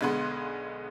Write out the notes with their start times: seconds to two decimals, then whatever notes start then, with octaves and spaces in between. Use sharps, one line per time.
0.01 B1 D3 G#3 B3 C6